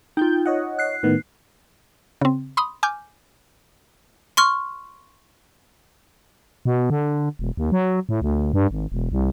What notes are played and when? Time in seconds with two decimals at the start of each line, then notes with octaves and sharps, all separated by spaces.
0.17 D#4 F4 G5 G6
0.46 C#5 D#5 F#5
0.79 F#6 C7
1.03 A2 D#3 B3
2.21 C#3 C4
2.57 B5 C6 D#6
2.83 G#5 D6 F6 G6
4.37 C6 C#6 F6
6.65 B2
6.90 D3
7.39 E1
7.57 D#2
7.72 F#3
8.09 A2
8.22 D2
8.53 G2
8.71 G#1
8.92 E1
9.12 C2